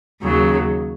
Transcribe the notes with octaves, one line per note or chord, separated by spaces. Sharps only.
D#2 C#3 F#3